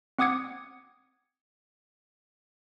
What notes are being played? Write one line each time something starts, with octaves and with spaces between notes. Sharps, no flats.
C4 F#5 D6 D#6 G#6 C#7